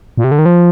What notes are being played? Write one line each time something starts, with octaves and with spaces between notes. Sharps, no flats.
A#2
C3
D3
D#3
F3